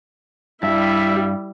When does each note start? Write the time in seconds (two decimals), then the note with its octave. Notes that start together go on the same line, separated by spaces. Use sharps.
0.63 G2 G3 E4 E5